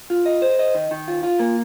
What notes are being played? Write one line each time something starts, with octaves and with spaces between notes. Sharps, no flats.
F4
D#5
C5
D#5
D#3
D#3
F4
F4
A#3